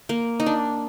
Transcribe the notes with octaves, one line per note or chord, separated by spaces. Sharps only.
A#3
D#4
D4